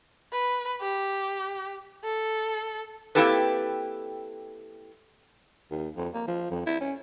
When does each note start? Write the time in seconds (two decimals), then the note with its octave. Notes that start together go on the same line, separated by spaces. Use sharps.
0.32 B4
0.81 G4
2.04 A4
3.15 A#3 C4 E4 G4 A4 B4
5.71 D#2
5.97 F2
6.14 A#3
6.28 F3
6.51 F2
6.67 E4
6.81 C#4